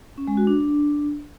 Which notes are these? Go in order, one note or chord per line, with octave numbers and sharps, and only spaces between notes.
C#4
G#3
F#4
D4